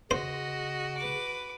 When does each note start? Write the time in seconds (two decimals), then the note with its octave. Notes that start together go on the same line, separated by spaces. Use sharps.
0.11 C#3 F#4 C5 D#5
0.97 B4 D6